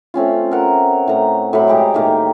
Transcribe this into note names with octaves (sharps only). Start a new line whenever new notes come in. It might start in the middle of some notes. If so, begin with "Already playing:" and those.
A3 C4 C#4 F4
A#4 F#5
A2 A#5
A2 F#3 B5
G#3 G4 A#5 D6
A2 D#3 A#3